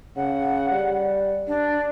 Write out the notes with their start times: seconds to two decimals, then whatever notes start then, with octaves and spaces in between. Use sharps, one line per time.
0.16 C#3 F#5
0.72 G3
1.47 D4